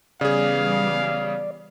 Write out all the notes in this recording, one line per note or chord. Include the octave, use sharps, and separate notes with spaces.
C#3 E3 G3 B3 G#4 D5 F5